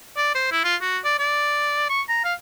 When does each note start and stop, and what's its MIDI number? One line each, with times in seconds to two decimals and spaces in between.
0.17 0.30 74
0.35 0.49 72
0.52 0.60 64
0.64 0.76 65
0.82 0.98 66
1.05 1.16 74
1.19 1.86 74
1.90 2.02 85
2.09 2.22 82
2.25 2.34 77